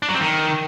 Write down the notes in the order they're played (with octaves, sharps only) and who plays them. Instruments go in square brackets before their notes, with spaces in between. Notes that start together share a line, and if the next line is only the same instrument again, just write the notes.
[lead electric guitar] D4
F#3
C4
D#3